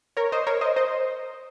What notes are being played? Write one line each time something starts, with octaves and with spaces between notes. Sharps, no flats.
A#4 C#5
C5 D#5
A#4 C#5
C5 D#5
C5 D#5